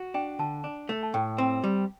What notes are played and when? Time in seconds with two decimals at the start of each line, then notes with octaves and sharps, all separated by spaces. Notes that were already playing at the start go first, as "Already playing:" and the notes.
Already playing: F#4
0.14 D4 G5
0.39 D3 A5
0.64 D4
0.89 A3
1.03 A5
1.14 A2 G5
1.38 C4
1.64 G3